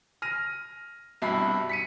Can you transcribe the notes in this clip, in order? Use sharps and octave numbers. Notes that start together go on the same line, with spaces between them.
F6 A#6 D#7
C2 G2 B2 E4 B5 C7
B6 C#7 D#7